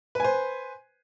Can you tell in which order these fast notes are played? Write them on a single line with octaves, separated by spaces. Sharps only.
B4 G#5 C5